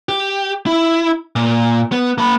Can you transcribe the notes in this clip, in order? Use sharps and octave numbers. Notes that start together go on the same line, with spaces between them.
G4
E4
A#2
B3
A#3 B5